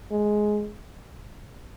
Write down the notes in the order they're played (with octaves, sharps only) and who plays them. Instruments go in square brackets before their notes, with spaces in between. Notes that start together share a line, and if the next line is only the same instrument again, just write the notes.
[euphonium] G#3